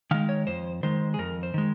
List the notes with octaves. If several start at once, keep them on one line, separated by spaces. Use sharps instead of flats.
D#3 G#3 F5
C#5
F2 C5
D#3 G#3 C5
G#4
F2 A#4
C5
D#3 G#3